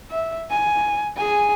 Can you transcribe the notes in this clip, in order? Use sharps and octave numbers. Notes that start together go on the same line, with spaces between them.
E5
G#5
G#4 G#5